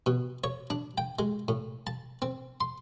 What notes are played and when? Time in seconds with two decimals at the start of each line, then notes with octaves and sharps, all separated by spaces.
0.06 B2
0.44 C#5
0.70 D4
0.98 G5
1.19 G#3
1.48 A2
1.87 A5
2.22 C4
2.61 C6